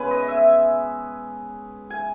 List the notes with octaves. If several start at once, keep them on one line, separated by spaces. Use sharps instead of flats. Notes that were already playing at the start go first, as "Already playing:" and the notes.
Already playing: B2 G#3 C#4 B4 C#5 G#5
D#5
E5
G#5